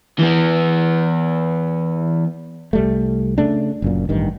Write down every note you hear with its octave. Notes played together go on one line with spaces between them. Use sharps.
E3 B3
C2 G3 A3
C#3 A3 D4
F#1 F#2 A#2
A1 G2 D#3